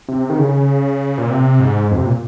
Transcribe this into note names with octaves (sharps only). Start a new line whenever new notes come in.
C3
D#3
C#3
A#2
C3
G#2
F2
C3
A#2